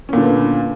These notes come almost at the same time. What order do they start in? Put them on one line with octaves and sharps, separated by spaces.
C#4 A#2 D3 B3